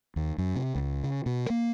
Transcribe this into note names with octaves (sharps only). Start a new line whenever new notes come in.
D#2
F#2
C3
C#2
C#3
B2
A#3